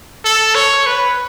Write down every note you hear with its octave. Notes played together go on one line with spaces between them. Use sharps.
A4
C#5
B4